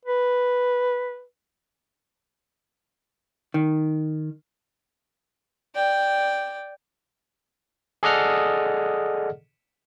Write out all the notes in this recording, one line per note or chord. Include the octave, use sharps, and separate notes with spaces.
B4
D#3
D5 G5
G#4 A4 D5 D#5 F#5 F6